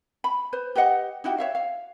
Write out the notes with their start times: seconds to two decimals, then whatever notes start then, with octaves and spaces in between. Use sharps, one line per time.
0.24 B5
0.53 B4 C5
0.75 G4 B4 D#5 F#5
1.24 D#4 E4 F#4 G4
1.38 C#5 E5 F5
1.55 F5